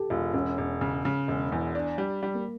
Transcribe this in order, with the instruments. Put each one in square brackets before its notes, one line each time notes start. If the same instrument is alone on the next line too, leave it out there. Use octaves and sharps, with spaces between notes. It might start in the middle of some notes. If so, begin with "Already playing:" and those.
Already playing: [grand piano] G4 A4
[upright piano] E1 [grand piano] F4
[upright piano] E1 [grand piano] C#4
[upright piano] E1
C#3
C#3
E1
E2
D4
G3
G3
[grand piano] A#3